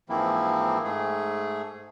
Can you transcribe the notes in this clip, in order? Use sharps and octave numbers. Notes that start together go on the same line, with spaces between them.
G#2 E3 F3 A#3 C4 E4
G#2 A3 G#4